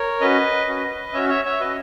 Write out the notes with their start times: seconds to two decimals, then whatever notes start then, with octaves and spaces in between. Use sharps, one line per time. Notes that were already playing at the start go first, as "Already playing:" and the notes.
Already playing: A#4 C#5
0.21 C#4 F#4 B4 D#5
0.68 C#4 F#4
1.13 C#4 F#4 C#5 E5
1.29 C#5 E5
1.45 C#5 E5
1.60 C#4 F#4 B4 D#5